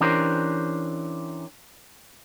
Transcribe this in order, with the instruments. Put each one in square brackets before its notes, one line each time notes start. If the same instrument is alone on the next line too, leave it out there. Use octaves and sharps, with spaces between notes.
[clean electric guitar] E3 C#4 D4 G4 A#4 C5